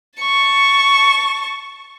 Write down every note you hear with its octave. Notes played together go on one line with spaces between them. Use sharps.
A5 C#6